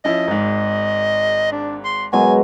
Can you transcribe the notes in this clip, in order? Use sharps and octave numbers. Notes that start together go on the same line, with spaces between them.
F3 C#4 E4 D#5
G#1 G#2
D4
C6
B2 F#3 G#3 G#5